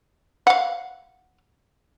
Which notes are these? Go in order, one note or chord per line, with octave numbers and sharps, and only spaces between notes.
F5 F#5